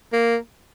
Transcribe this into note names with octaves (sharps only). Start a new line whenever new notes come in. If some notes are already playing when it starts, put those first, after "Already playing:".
A#3